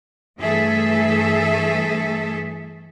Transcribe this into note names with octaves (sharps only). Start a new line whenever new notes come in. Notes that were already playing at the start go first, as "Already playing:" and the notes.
G2 E3 A3 G#4 A4 E5